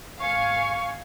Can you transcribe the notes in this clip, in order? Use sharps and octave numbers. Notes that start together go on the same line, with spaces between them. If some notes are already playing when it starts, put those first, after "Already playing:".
G#1 F5 G#5 C#6